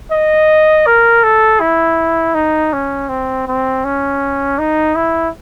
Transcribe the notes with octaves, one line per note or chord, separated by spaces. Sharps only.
D#5
A#4
A4
E4
D#4
C#4
C4
C4
C#4
D#4
E4